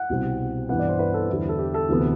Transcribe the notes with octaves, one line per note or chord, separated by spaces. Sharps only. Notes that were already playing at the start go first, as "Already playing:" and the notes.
Already playing: F#5
C2 B2 G3 C4
G2 E3 B3 F#5
D5
C5
B4
A4
E2 D3 G3 E4
A4
G4
A4
D2 C3 E3 B3